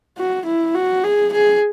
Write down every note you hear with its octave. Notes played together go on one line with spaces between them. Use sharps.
F#4
E4
F#4
G#4
G#4